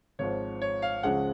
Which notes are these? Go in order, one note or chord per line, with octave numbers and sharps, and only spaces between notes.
G#1 G#2 F3 C#5
C#5
F5
C#2 C#3 F3 G#3 F#5